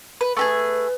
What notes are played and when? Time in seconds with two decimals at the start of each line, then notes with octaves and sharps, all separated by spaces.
0.21 B4
0.37 A3 G4 G#4 B4